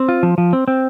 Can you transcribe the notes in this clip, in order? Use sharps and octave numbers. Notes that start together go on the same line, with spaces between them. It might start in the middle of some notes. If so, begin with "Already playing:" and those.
Already playing: C4
F4
F3
F3
C4
C4